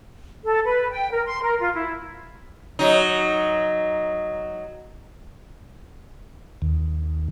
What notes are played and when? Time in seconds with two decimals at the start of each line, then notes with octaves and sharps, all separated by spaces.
0.44 A4
0.65 B4
0.90 G5
1.11 A#4
1.27 C6
1.43 A#4
1.60 F4
1.75 E4
2.79 F#3 D#4
6.62 D#2